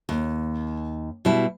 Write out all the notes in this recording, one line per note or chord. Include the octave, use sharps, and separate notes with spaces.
D#2
B2 G3 E4